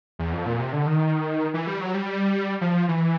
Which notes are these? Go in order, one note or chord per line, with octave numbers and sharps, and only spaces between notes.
E2
F2
A#2
C3
D3
D#3
E3
G3
F#3
G3
F3
E3